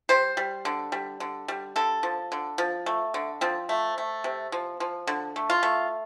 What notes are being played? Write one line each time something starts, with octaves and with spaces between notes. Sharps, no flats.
G3 C5
G3
D3
G3
D3
G3
D3 A4
F3
D3
F3
A3
D3
F3 C4
A3
A3
C3
F3
F3
D3
A3
F4
A3